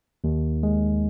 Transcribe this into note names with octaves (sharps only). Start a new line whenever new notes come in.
D#2
G#3